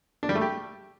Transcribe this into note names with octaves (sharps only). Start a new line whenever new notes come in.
D4
G3
A3
G4